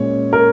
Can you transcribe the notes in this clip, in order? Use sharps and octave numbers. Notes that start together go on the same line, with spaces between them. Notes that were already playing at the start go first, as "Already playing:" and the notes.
Already playing: A#2 G#3 C#4 C#5
A#4